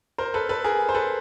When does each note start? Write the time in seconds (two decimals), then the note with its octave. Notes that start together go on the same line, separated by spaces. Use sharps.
0.18 A#4 C5
0.34 A4 B4
0.49 A4 B4
0.64 G#4 A#4
0.89 C5
0.95 A4 B4